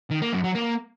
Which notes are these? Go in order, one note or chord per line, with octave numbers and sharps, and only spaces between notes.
D#3
A#3
F#2
F#3
A#3